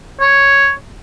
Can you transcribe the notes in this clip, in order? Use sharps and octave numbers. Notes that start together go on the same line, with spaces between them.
C#5